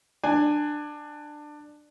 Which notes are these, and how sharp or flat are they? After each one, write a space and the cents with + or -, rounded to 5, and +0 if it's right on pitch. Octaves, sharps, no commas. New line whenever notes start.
D4 +20 G#5 +0